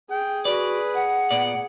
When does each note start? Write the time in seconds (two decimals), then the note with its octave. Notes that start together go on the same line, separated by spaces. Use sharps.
0.11 G#4 G5
0.45 F#4 B4 D5
0.94 F#5
1.31 A#2 B3 D5